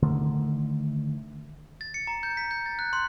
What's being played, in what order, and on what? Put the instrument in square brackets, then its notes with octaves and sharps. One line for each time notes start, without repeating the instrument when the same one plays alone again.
[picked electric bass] D3 D#3 A3
[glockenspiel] A6
C#7
A#5
G6
B6
G6
A6
F#6
C6